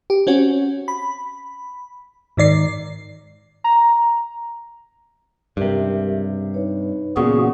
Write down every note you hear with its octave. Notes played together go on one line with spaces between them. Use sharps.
G4
C4 C#4 F#4
B5
G#2 D#3 D5 C7
A#5
C#2 G2 C3 G4 A#4 E5
D#4 B4 C#5
E2 A#2 C#3 B3 F#4 G#4